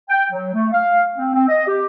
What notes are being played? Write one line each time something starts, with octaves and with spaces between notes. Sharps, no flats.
G5
F#3
A3
F5
C4
C4
D#5
G4